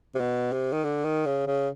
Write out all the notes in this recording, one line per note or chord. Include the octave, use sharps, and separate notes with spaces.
C3
B2
C3
D#3
D3
D#3
C#3
C#3